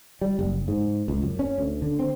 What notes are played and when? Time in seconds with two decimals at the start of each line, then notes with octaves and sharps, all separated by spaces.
0.21 G3
0.39 F#1
0.68 G#2
1.08 C#2
1.22 F#2
1.39 C#4
1.58 D2
1.82 D3
1.99 C4